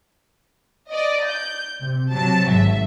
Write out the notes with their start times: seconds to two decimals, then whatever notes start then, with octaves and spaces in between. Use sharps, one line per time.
0.90 D5 D#5
1.26 G6
1.80 C3
2.11 C3 F#3 A5
2.48 G#1 E5